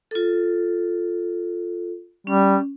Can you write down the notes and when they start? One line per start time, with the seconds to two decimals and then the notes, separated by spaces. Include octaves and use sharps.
0.11 F4 A4
2.27 G3 C#4